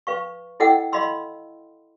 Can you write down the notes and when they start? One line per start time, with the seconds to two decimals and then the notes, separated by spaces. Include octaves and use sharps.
0.07 B4 F5 C#6
0.60 E4 A4 D#5 F#5 G5 E6
0.92 D#5 F5 B5 C6 E6